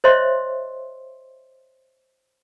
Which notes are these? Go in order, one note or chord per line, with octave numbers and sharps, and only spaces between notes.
C5 C#5 D#5 E5 C6